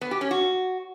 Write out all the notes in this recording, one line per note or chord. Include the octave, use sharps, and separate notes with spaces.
B3
G4
C#4
F#4